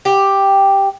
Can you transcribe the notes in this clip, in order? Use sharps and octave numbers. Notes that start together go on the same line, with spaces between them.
G4